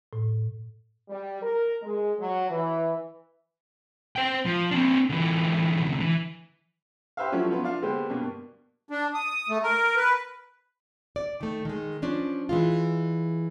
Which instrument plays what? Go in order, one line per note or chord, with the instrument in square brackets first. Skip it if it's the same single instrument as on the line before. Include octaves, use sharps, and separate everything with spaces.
[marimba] A2
[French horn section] G3
A#4
G#3
F#3
E3
[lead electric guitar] C5 G5
F3
C4 D4
D3 E3
C2 D3
E3
[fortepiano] G4 B4 C5 E5 F5
F3 F#3 A3 C#4 E4
F3 F#3 B3 F4
D4 F4 F5
D3 G#3 A#3 B3 G4 C5
G2 B2 A#3
[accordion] D4
D#6
A3
A#4
B4
[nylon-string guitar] D5
D#3 A3
D#3 G#3
F3 C#4 D4
E3 G#3 F4